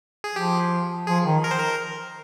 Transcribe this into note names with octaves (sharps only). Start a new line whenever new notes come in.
G#4
F3 G4
F3 G#4
D#3
A#4
C5
A#4